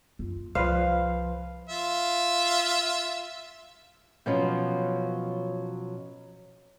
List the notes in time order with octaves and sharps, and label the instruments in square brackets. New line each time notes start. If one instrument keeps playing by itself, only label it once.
[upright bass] F#2 F4
[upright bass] C2 [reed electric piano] F3 B4 C5 [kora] F5
[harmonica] F4 E5
[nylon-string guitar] B2 F3 F#3 B3 C#4